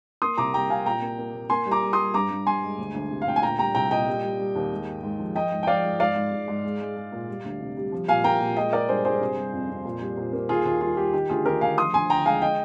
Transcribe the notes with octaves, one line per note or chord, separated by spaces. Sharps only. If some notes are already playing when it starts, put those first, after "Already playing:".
A#3 C6 D#6
C2 A#5 D6
G3 G5 A#5
C3 F5 G#5
A#2 G5 A#5
A#3
A#3
A#2
A#3 G#5 C6
G3
A#5 D6
G3
C6 D#6
G3
G2 A#5 D6
G2
G2 G#5 C6
G#3
D2
D2
C3
F5
D2 G5
G#5
A#2 G5 A#5
G3 G5 A#5
C2 G5 A#5
A#2 D#5 G5
G3
G3
G3
D#2
G#3
G#2
G#2
F3
F3 D#5 G5
G#2
G5
F3 D5 F5
G#2
G#2 D5 F5
G#2
G#2
G#2
G#3
G#3
G#3
A#2
G3
D2
C3
G3
F3
A#2 F5 G#5
A#3 G5 A#5
A#2
G#3 D#5 G5
G#3 A#4 D5
G2 G#4 C5
G2 G#4 C5
C3
G3
F2
F2
A#2
G3
A#2
A#3
D#2 F4 G#4
D#2 F4
G3 F4
G3 G4
D#3 G4
D2 F4 G#4
D#3 G4 A#4
D2 F5 G#5
F3 C6 D#6
D2 G#5 C6
D3 G5 A#5
G#3 F5 G#5
D#5 G5